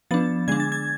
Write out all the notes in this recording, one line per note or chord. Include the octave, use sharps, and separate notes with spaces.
F3 B3 D4 A6
D3 G#3 D4 G#6
A6
G#6